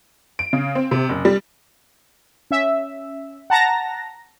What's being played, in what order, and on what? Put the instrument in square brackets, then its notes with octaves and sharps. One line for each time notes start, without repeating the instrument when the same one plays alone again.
[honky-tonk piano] D7
C#3
C4
C3
F#1
G3
[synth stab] C#4 E5
F#5 A5 A#5 A#6